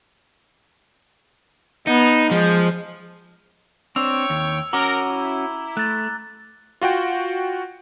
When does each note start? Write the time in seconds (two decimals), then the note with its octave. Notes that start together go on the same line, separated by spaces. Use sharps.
1.87 B3 D#4
2.31 F3 G#3
3.96 C4 D4 C#5 G5 C#6 E6 F7
4.30 D#2
4.73 C#4 F#4 A#4 A#5 D6 G7
5.09 E4
5.77 A3 F#6 A6
6.82 F4 F#4 F#5 G5